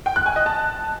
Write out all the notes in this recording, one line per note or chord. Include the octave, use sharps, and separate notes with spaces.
G5
F#6
G#5
D#5
A5